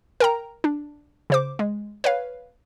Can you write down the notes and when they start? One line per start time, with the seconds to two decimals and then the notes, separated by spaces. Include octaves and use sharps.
0.20 A#4 G5 A#5
0.64 D4
1.30 C#3 C5 D6
1.59 G#3
2.04 B4 C#5 F5